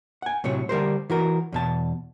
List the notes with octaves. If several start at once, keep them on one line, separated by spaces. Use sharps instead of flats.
F#5 G#5
A2 C3 F#3 C#5
D3 G3 A#4 C5
E3 F#4 A#4
E2 B2 A5